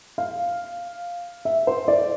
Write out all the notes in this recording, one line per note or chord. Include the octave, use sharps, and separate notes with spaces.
F5
E5
C5
D5